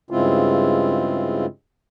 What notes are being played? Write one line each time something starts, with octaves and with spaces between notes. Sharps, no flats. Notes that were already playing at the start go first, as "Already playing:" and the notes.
G2 C#3 G#3 C4 E4 F4